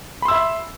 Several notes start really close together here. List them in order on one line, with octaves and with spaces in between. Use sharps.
B5 C6 E6 E5